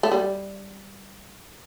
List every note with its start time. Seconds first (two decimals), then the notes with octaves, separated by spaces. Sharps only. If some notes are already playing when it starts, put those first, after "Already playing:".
0.03 A3
0.12 G3